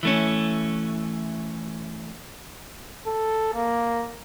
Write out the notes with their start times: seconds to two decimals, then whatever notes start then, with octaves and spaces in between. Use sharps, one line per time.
0.03 E3 A3 C#4
3.06 A4
3.54 A#3